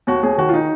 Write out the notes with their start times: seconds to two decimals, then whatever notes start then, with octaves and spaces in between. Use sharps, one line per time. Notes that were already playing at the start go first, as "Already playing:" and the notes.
0.07 D#2 F#4
0.23 D#2 G#4
0.38 D#3 F#4
0.49 F4
0.54 D#4